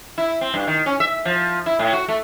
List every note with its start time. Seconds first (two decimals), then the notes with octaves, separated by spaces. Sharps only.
0.18 E4
0.41 C4
0.54 G2
0.67 D#3
0.86 C#4
1.00 E5
1.25 F3
1.66 E4
1.79 A2
1.93 F#4
2.08 A3